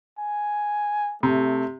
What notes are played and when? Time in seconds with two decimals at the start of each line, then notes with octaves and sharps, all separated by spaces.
0.19 G#5
1.23 C3 A3